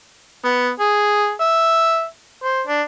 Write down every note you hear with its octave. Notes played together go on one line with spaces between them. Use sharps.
B3
G#4
E5
C5
D4